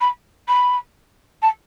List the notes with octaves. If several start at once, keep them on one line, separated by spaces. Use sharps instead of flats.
B5
B5
A5